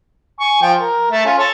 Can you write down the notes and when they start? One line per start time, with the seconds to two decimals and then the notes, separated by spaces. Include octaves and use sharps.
0.40 G#5 C#6
0.62 F3 G5
0.80 A#4
1.11 A3 A4
1.26 C#4 F4
1.38 A4 C#5